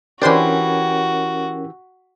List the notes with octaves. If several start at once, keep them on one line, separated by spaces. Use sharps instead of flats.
E3 C#4 D4 F#4 G4 A#4 C5 C6